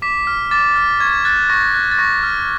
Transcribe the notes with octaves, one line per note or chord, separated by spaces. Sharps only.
D6 B6
F6
D6 A6
F6
C#6 G#6
F#6 A6
C#6 A#6
F#6
A6
C#6 A#6
F6